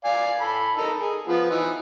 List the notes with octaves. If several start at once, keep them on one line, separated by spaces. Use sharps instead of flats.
D5 F5 G#5
A4 B5
D#4 A4 A#4
G#4
F3 B3
E3 D#4